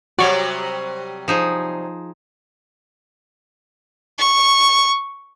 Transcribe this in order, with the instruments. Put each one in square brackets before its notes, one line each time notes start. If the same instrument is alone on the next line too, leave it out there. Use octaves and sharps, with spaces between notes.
[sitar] C3 F#3 G3 [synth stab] F#4 C#5 [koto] D5
[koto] F3 D#4 G#4
[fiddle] C#6